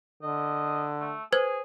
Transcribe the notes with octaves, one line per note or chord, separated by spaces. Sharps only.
D3 D#5
A3
G#4 B4 C5 G#6